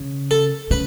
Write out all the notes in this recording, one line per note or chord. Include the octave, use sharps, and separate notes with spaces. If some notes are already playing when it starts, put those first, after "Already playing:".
Already playing: C#3
A4
C#3 B4